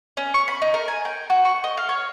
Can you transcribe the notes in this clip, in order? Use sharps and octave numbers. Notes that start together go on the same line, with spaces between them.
C#4
C#6
B5
D#4
A#4
G#5
G5
F#4
C#6
D#5
F5
C#5